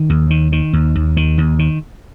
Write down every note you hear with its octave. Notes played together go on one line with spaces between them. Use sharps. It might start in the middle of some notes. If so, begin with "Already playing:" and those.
Already playing: D#3
D#2
D#3
D#3
D#2
D#2
D#3
D#2
D#3